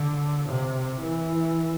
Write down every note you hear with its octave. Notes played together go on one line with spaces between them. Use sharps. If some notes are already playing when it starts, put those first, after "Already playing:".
Already playing: D3
C3
E3